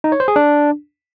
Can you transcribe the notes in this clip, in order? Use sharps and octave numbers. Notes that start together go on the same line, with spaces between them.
D#4
C#5
C5
G#4
D4